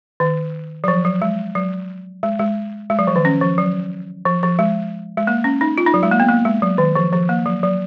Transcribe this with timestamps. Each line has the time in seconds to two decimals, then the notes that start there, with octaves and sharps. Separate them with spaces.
0.20 D#3
0.84 F#3
0.88 F3
1.05 F#3
1.22 G#3
1.55 F#3
2.23 G#3
2.39 G#3
2.90 G#3
2.99 F#3
3.07 F3
3.16 D#3
3.25 C#4
3.41 F3
3.58 F#3
4.25 F3
4.43 F3
4.59 G#3
5.17 G#3
5.27 A#3
5.44 C#4
5.61 D#4
5.78 F4
5.87 D#4
5.94 F#3
6.03 G#3
6.11 A#3
6.20 B3
6.28 A#3
6.45 G#3
6.62 F#3
6.78 D#3
6.95 F3
7.13 F3
7.29 A#3
7.46 F#3
7.63 F#3